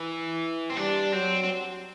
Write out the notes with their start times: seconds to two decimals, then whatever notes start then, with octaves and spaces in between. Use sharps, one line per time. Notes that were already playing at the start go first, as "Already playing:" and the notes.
Already playing: E3
0.70 C4
0.77 G3 D4
1.13 F#3 C4
1.44 C4